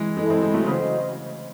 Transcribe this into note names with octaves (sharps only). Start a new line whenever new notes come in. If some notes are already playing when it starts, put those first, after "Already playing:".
Already playing: E3 G#3
E3 G#3 E4 A4 D#5
G#3 C4
G#3 C4
F#3 A3
C#3 E3 F#4 C5 D#5